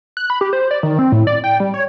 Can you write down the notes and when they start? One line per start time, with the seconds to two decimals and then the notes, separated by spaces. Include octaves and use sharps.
0.17 F#6
0.30 B5
0.41 G4
0.53 C5
0.71 D5
0.83 D#3
0.99 C4
1.12 A2
1.27 D5
1.44 G5
1.60 G3
1.74 C#5